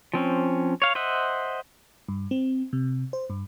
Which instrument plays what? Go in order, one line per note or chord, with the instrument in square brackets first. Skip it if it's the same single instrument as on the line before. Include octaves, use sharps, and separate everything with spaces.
[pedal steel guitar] F3 C4 C#4
C#5 F5
C5 D#5 E5 F#5
[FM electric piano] G2
C4
C3
C5
G2